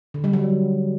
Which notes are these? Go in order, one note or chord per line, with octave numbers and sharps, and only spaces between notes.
D3
G3
F#3